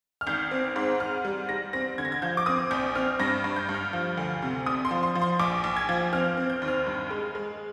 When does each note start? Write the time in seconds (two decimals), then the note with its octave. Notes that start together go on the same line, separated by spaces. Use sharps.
0.21 F6
0.27 G#1 G6
0.51 C4
0.76 G#2
1.00 G#2 F6
1.25 G3
1.49 G3 A#6
1.73 C4 A#6
1.98 D3 G#6
2.05 A#6
2.12 G#6
2.22 F3 G6
2.37 D6
2.46 C4 D#6
2.71 A#1 G6
2.95 C4 F6
3.20 G2 A#6
3.44 G2
3.56 G6
3.69 G2
3.74 F6
3.93 F3
4.17 D2
4.42 C3
4.66 A#1 D#6
4.85 C6
4.91 F3
5.03 C6
5.15 F3
5.22 C6
5.40 A#1 D6
5.64 A#1
5.77 G#6
5.89 F3
6.13 C4 F6
6.37 C4
6.50 G6
6.62 D#2
6.68 F6
6.87 G2
7.11 G#3
7.35 G#3